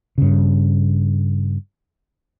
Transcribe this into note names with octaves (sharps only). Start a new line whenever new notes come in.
G2 C#3